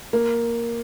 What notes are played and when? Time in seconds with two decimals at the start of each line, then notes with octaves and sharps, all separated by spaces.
0.13 A#3